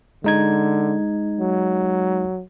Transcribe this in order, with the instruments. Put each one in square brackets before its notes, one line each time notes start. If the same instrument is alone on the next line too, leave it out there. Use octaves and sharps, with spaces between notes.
[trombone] D3 [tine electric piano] G#3 D#4 G#6
[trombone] F#3